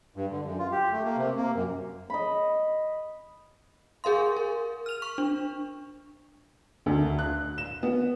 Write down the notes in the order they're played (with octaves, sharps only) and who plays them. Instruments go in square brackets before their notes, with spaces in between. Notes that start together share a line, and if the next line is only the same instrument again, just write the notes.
[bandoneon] G2
D3
F#2
F4
G4
A3
A#3
C3
A#3
F#2
[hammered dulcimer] D#5 B5
[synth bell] G#4 A#4 F5 C6
A#4
F6 F7
C#6
D4
[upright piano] D2
F#6
E7
B3